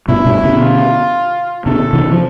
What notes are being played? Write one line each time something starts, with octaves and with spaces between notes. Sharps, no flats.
G2 B2 E4
G2 B2
B2 D3
F4
B2 D3 A4
C3 E3
F3